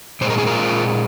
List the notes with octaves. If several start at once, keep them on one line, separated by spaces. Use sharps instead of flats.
A#2 G#3 C4 C5
A#4
G#4
F4 A#4